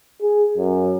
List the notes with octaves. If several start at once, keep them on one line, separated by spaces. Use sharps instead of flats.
G#4
F#2